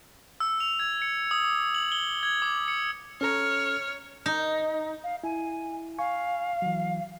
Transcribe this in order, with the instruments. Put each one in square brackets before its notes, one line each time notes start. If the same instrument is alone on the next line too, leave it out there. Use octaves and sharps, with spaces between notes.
[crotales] E6
F7
G#6
C#7
D#6
D6
F#7
G7
G#6
D6
C#7
[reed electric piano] C#4 A4 A#5 [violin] C#5 [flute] F6
[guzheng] D#4
[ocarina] F5
[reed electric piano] E4 [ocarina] G#5
[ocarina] F5 [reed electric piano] G#5 C#6
[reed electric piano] E3 F#3